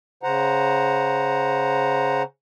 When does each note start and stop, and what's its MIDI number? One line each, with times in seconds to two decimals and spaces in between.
0.23 2.23 49
0.23 2.23 72
0.23 2.23 78
0.23 2.23 82